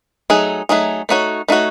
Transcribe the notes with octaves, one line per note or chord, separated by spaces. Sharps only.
F#3 A3 D#4 G#4
F#3 A3 D#4 G#4
A3 D#4 F#4 C#5
A3 D#4 F#4 C#5